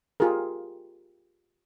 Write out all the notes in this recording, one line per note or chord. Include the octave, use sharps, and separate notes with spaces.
F4 G4 G#4 A#4